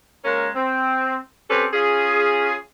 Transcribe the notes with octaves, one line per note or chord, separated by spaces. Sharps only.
G#3 A#3 C#4 A#4
C4
C4 C#4 G4 A4 B4
C#4 F4 G#4